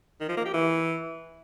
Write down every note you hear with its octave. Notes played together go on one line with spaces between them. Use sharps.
D#3
F3
A#3
G4
E3